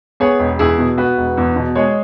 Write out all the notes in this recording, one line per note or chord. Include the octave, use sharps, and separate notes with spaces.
B3 G#4 C#5
E1
E2 E4 G#4
B2
B3 F#4 B4
E1
E2
B2
G#3 G#4 C#5